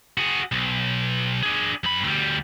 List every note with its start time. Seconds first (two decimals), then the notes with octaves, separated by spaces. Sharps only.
0.18 F#4 G#4
0.52 B1
1.43 D4 G#4
1.84 F#2 B5
2.04 D2 G3